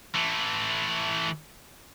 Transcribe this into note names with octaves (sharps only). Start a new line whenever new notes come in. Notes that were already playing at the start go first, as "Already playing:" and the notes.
E3 A3